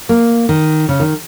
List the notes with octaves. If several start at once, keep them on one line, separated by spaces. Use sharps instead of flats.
A#3
D#3
C#3
D#3